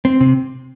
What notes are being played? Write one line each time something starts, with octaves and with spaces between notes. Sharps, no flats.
C4
C3